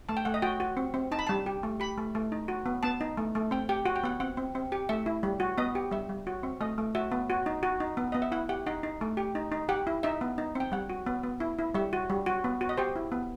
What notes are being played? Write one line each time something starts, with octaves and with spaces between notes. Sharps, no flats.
A3 A5
G5
A3 F#5
D#5
F#4 G5
F#4
C4
C4
D#4 A5
B5
G3 A5
G4
A3
G4 B5
A3
A3
D#4
F#4
B3
B3 A5
D#4
A3
A3
C4 G5
G4 G5
F#4 F#5
G5
B3 F#5
C4 F#5
C4
C4
G4
A3 E5
E4
G3
F#4
B3 D#5
G4
G3 E5
G3
F#4
C4
A3 D#5
A3
F#4 E5
B3
F#4
D#4
F#4
D#4
B3
B3 D#5
E5
E4 F#5
G4 F#5
D#4 F#5
D#4
A3
G4
D#4
D#4
G4 F#5
E4
D#4 E5
B3
D#4
C4 G5
G3 F#5
F#4
B3
B3
E4
E4
G3 E5
F#4
G3
F#4
B3
F#4
D#5
G4 C5
E4
B3